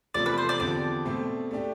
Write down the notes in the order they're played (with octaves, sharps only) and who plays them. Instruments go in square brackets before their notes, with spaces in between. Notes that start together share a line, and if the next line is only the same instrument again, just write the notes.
[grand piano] E2 C3 F3 A3 [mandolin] D5
[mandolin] B4
C5
D5
[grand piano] E2 D3 F3 C4 G4 [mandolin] D5
[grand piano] B2 A3 C4
A3 D4 G4